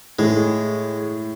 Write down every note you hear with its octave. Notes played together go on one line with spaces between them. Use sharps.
A2 G#3